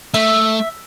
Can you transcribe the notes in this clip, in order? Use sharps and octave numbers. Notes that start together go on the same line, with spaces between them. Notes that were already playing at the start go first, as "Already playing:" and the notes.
A3 E5